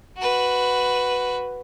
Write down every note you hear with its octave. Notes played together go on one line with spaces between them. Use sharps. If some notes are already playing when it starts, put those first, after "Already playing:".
F#4 B4